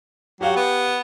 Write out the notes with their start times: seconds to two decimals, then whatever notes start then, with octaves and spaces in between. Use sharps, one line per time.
0.41 F#3 G4 F5 G5
0.56 B3